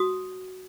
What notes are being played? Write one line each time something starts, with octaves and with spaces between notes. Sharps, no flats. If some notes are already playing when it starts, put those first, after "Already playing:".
Already playing: F#4 D#6